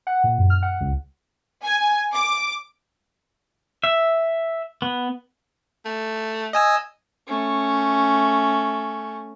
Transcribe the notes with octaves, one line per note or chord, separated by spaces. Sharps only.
F#5
A#2
F#2
F6
F#5
C#2
G#5
D6
E5
B3
A3
D#5 G#5 E6
A3 C#4